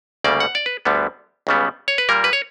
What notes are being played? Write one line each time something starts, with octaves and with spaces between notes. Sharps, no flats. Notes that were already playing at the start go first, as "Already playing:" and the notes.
D2 C#3 G3 A#3 D5
F#5
D5
B4
D2 D3 G3 B3
C#2 C#3 G3 B3
C#5
B4
A#2 G3 A#3 A#4
B4
C#5